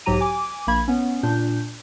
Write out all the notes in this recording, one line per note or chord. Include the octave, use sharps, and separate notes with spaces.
B1 G#2 F#3 G4 A#5 D#7
G#5 D6
A#1 A#3 B5 G#6
B3 C#4
A#2 D4 G6